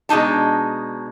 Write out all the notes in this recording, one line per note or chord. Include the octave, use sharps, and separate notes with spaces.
B2 G#3 D4 D#4 A5